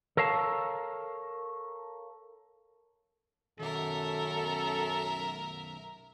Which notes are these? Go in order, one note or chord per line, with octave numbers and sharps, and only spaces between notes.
A4 A#4 C#5 F5 A5
B1 F#2 D#3 A4 A#4 E5